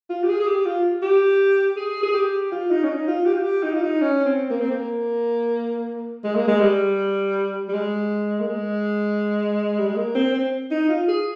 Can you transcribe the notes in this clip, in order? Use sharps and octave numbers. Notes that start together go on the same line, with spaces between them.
F4
G4
G#4
G#4
G4
F4
G4
G#4
G#4
G4
F4
D#4
C#4
D#4
F4
G4
F4
G4
D#4
F4
D#4
C#4
C4
A#3
C4
A#3
G#3
A#3
G#3
G3
G3
G#3
A#3
G#3
G3
G#3
A#3
C4
C4
D#4
F4
G#4